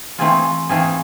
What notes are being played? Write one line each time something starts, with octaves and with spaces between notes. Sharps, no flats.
E3 A3 C4 F4 G#4
E3 A3 C4 F4 G#4